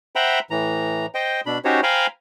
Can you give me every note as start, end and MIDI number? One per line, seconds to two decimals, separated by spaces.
0.16 0.39 72
0.16 0.39 76
0.16 0.39 78
0.16 0.39 79
0.16 0.39 82
0.16 0.39 83
0.50 1.06 45
0.50 1.06 52
0.50 1.06 82
1.15 1.41 72
1.15 1.41 75
1.15 1.41 79
1.46 1.58 47
1.46 1.58 62
1.46 1.58 83
1.65 1.81 61
1.65 1.81 63
1.65 1.81 66
1.65 1.81 67
1.65 1.81 72
1.65 1.81 73
1.83 2.07 72
1.83 2.07 77
1.83 2.07 79
1.83 2.07 80
1.83 2.07 82
1.83 2.07 83